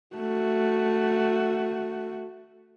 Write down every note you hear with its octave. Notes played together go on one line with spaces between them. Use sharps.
A3 F#4